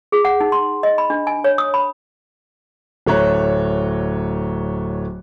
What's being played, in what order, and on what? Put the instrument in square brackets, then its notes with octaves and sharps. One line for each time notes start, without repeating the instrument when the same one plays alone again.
[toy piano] G#4
F#5
D#4
C6
D#5
B5
D4
G#5
C#5
D#6
B5
[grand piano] D1 A3 C#5 A#5 F#6